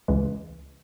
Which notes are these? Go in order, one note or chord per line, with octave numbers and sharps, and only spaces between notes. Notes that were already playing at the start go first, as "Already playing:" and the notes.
C#2 C#3 E3 G#3